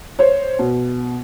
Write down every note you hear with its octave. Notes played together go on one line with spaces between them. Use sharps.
C5 C#5
B2